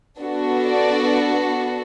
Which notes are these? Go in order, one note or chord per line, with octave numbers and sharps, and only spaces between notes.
B3 D4 F#4 A4
D5